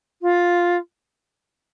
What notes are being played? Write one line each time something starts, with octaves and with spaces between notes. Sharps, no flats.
F4